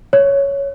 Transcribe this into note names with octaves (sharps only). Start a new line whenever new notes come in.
C#5